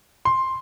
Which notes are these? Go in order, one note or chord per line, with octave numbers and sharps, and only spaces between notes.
C6